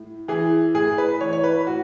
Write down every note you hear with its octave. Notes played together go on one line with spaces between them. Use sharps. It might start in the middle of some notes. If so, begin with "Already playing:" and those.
Already playing: A2
E3 G#4
A2 G#4
B4
E3 C#5
C#5
B4
A2 F#4